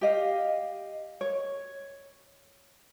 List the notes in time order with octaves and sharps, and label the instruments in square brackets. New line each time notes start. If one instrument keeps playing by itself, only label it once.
[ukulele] G4 D#5 F5
C#5